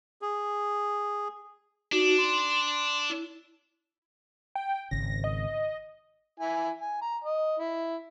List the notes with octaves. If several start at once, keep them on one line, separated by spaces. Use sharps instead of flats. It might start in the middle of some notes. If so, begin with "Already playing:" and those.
G#4
D4 D#4 F#4
C6
E4
G5
G#1 C#3 A#6
D#5
E4 G#5
G#5
A#5
D#5
E4